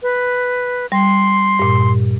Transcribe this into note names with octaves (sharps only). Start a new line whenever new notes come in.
B4
G3 C6
G2 A#2